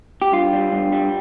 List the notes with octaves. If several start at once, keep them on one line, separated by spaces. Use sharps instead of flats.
G4
G2 F4
G3
G2
G3